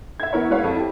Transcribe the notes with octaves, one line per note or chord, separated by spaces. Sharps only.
E5 G#6
E3 B3 E4 A#4 C#5
G#3 E4 F#4 B4 C#5 F5
F2
E4 G4